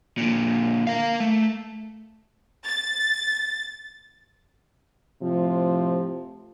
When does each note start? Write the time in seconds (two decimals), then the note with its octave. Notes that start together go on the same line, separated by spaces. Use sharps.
0.18 A#2 D3
0.87 A#4 F5
1.20 A3
2.66 A6
5.22 A2 C3 F3